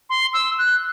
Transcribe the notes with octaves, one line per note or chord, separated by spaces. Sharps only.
C6
E6
F#6